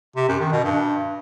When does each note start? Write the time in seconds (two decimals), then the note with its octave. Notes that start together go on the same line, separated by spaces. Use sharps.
0.16 C3
0.28 F#2
0.40 D#3
0.52 B2
0.64 G2